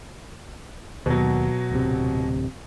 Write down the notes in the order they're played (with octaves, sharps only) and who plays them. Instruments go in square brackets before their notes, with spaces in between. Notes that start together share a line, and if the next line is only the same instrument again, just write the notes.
[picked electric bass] D#2 [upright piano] B2 F#3
[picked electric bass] D1 C3